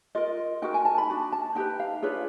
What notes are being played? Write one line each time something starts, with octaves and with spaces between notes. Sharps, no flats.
F4 A#4 D#5
D#4 F#4 A#4 G5
G#5
A5
B5
D4 F#4
A5
D#4 G4 B4 G5
F5
D4 F4 G#4 B4 C#5